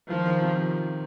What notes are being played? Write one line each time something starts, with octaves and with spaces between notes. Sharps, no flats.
D#3 F3
D#3
C3